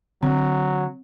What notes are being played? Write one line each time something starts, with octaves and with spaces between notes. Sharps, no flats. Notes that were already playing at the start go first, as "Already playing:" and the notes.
D3 F#3 C4